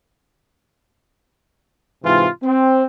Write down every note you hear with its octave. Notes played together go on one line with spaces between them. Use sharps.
G#2 C3 E3 F4
C4